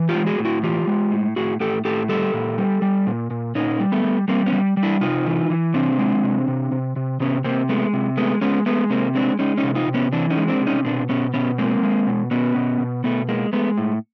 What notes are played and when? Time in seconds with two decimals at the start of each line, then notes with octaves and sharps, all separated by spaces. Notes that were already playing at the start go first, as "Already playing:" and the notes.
Already playing: E3
0.09 F4 G4
0.15 G#3
0.26 F#4 G#4
0.39 A2
0.45 E4 F#4
0.63 E3 F4 G4
0.87 G#3
1.11 A2
1.36 A2 F#4 G#4
1.60 A2 G4 A4
1.85 A2 G4 A4
2.09 G3 G4 A4
2.34 A#2
2.58 G3
2.82 G3
3.07 A#2
3.31 A#2
3.55 A#2 C#4 D#4
3.80 G3
3.92 A3 B3
4.04 G3
4.28 G3 A#3 C4
4.46 B3 C#4
4.52 G3
4.77 G3
4.83 D4 E4
5.01 C3 D#4 F4
5.26 E3
5.50 E3
5.74 C3 C4 D4
5.98 G#3
6.23 C3
6.48 C3
6.72 C3
6.96 C3
7.20 C3 B3 C#4
7.44 C3 A#3 C4
7.69 G#3 A3 B3
7.93 C3
8.17 G#3 A3 B3
8.41 G#3 B3 C#4
8.66 G#3 A3 B3
8.90 C3 A#3 C4
9.15 G#3 C4 D4
9.39 G#3 C#4 D#4
9.58 C#4 D#4
9.64 C3
9.75 D#4 F4
9.88 C3
9.94 B3 C#4
10.12 E3 C4 D4
10.30 C#4 D#4
10.37 G#3
10.48 C4 D4
10.61 C3
10.67 C#4 D#4
10.85 B2 C4 D4
11.09 B2 B3 C#4
11.34 B2 B3 C#4
11.58 G#3 A#3 C4
11.83 G#3
12.07 B2
12.31 B2 B3 C#4
12.56 B2
12.80 B2
13.04 B2 A3 B3
13.29 G#3 A#3
13.53 G#3 A3 B3
13.78 A2